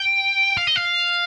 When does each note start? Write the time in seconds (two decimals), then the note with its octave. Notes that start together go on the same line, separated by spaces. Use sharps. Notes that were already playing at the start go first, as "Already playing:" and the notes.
Already playing: G5
0.57 F5
0.67 D#5
0.76 F5